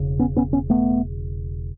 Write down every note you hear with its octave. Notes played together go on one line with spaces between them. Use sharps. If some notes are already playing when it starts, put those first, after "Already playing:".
Already playing: E1 C#3
B3 C#4
B3 C#4
B3 C#4
A3 B3